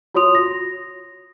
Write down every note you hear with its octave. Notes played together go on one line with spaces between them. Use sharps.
F4 F#4 C#5 C6 D#6 F7
A#6